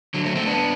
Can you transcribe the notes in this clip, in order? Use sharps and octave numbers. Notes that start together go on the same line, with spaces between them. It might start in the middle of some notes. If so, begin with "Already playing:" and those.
D3 F#3
F#3 A3
A3 C4
B3 D4